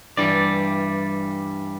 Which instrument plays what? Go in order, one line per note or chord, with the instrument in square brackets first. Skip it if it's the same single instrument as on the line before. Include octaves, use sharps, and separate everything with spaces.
[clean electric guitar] G2 E3 G3 D5